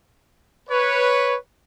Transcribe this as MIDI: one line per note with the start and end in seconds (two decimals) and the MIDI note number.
0.70 1.36 71
0.70 1.36 73